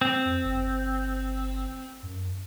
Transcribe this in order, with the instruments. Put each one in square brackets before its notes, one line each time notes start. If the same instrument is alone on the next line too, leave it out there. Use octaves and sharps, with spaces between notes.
[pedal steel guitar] C4
[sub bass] F2
G1
F#2